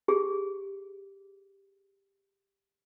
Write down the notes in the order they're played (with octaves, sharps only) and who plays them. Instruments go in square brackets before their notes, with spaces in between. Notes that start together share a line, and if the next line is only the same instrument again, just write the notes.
[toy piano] G4 G#4